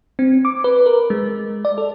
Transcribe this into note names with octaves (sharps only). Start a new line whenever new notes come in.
C4
D6
B4
A#4
G#3
D5
A4